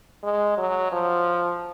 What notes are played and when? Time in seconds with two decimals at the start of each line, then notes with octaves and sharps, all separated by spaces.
0.23 G#3
0.57 F#3
0.92 F3